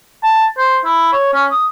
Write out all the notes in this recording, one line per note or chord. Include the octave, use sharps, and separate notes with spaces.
A5
C5
E4
C#5
C#4
D#6